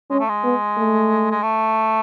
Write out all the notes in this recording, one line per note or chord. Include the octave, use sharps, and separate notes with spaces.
G#3 C#4
A3
G#3
B3
A3
G#3
A3